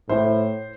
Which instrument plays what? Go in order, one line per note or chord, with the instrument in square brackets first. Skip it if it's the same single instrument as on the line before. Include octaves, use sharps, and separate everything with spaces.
[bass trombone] A2 [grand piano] C5